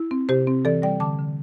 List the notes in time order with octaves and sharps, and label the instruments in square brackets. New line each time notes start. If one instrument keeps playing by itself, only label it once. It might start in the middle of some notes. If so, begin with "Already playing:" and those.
Already playing: [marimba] E4
C4
C3 G4 C5
C4
E3 A4 D5
G3 D5 G5
D3 A5 D6
D3